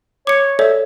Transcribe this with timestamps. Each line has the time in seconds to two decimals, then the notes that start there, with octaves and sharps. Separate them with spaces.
0.27 C#5 D6 C#7
0.59 A4 C#5 D5 E5